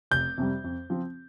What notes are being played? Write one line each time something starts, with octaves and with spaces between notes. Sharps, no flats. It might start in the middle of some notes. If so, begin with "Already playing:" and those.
F1 G6
F2 C3 G3
F2
F3 C4